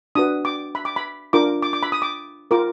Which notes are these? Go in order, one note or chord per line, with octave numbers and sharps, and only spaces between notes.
D4 F#4 B4 D#6
D6
B5
D6
B5
D4 F4 A#4 D6
D6
D6
B5
D#6
D6
F4 A#4 D6